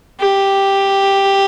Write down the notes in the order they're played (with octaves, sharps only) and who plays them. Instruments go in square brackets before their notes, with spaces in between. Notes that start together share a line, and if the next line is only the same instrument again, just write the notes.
[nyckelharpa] G4